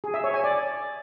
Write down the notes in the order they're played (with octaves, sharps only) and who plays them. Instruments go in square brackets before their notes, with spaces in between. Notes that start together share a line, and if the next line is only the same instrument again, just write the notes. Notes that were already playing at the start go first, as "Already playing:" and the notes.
[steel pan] G#4
E5
C#5
G#5
D5